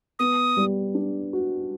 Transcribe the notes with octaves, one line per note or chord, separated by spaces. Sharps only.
B3 D#6
G3
D4
F#4